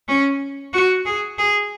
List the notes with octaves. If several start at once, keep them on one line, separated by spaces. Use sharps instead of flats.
C#4
F#4
G#4
G#4